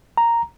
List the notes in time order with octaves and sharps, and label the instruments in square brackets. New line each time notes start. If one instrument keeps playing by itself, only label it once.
[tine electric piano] A#5